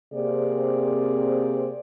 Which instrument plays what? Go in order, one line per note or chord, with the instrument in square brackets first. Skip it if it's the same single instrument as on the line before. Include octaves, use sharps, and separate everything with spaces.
[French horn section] C3 A#3 C4 G#4 C5 D5